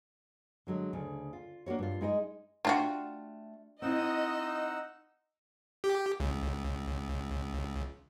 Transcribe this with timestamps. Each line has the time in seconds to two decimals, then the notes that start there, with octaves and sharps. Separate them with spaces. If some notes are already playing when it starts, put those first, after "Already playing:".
0.67 D3 F#3 G#3
0.93 D2 C#3
1.33 F4
1.66 A#3 D4 F#4 C#5
1.79 G2 F4
2.01 G#3 D#4 A#4 D#5
2.65 A3 D4 F4 F#4 G5
3.82 C4 D#4 E4 D#5 F#5 E6
5.84 G4
6.20 C#2